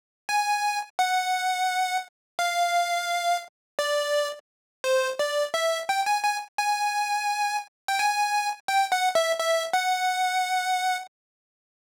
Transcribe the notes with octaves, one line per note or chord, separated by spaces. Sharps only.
G#5
F#5
F5
D5
C5
D5
E5
G5
G#5
G#5
G#5
G5
G#5
G5
F#5
E5
E5
F#5